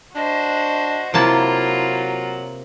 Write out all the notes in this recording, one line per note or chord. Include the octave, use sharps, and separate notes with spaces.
D4 F#4 C5 D#5
C3 F#3 A#3 E4 F4 A5